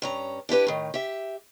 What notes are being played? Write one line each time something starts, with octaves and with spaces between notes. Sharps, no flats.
G2 C#4 A#5
D4 E4 G4 B4
A2 D#3
G4 E5